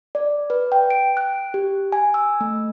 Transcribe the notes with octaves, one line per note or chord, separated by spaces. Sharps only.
D5
B4
G5
D7
F#6
G4
G#5
E6
A3